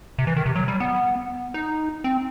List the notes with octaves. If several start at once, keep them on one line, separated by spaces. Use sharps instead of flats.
C3
E3
D#3
C3
F#3
G3
B3
D#4
C4